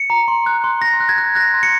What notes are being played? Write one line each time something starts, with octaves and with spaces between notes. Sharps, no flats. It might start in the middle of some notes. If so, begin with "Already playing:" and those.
Already playing: C#7
A#5
C6
F#6
C6
C6 A#6
F#6
G#6
F#6
F#6 A#6
C6
C#7